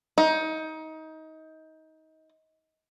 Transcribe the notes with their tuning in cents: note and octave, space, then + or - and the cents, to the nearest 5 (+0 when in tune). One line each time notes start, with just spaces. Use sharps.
D#4 +25